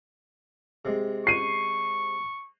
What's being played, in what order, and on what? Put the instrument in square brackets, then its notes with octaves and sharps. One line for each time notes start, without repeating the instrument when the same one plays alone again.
[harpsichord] C3 G#3
[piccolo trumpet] C#6 [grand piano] C7 D#7